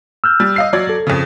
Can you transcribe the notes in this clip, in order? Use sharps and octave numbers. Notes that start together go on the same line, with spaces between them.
E6 F6 G6
G3
D#5 F5 C7
F#3 D5 G#6
A4
F2 C#3